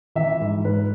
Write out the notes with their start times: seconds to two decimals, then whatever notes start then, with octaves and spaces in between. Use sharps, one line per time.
0.16 E3 E5
0.40 G#2
0.64 G#2 B4